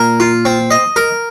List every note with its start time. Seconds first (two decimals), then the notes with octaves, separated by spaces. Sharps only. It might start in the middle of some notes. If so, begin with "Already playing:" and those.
Already playing: A#2 A#4
0.20 F4
0.45 C4
0.71 D#5
0.96 A#4